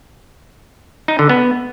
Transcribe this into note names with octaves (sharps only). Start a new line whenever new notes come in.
D#4
D3
B3